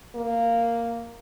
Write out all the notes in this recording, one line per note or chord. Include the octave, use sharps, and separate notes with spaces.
A#3